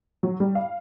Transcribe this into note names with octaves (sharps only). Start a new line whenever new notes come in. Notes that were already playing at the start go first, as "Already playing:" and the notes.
F#3
G3
F5